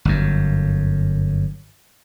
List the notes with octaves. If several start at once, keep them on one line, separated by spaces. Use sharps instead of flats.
G1 F#2